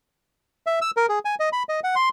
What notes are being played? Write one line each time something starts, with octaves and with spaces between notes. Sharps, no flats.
E5
E6
A#4
G#4
G#5
D#5
B5
D#5
F#5
C6